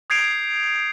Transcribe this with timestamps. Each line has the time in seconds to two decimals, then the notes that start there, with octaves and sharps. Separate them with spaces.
0.10 D#6 G6 G#6 C7 D7 F7